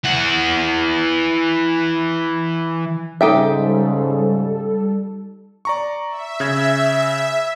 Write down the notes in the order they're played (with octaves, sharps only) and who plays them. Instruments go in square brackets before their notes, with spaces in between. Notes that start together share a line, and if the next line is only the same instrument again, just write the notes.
[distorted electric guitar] E3 F#5
[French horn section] G#2 C#3 [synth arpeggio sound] G3 A4 [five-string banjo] D#4 G4 E5
[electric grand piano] D5 A#5 C#6
[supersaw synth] E5
[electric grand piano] C#3 G#6